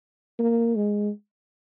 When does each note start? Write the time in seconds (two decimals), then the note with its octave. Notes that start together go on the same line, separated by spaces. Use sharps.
0.39 A#3
0.76 G#3